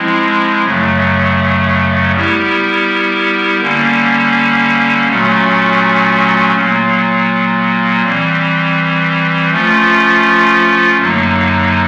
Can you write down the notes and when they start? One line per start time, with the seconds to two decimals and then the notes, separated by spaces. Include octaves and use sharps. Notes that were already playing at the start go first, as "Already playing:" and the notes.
Already playing: F3 G#3 C4 E4
0.64 F#2 C#3 F#3 A3
2.13 G3 B3 E4 G4 A#4
3.60 D3 G3 A#3 C#4
5.07 A#2 F#3 A3 C#4 F#4
6.56 A#2 F#3 A#3
8.02 E3 G3 C4
9.50 F3 A3 C#4 F4
10.98 F#2 D3 F#3 A#3 D#4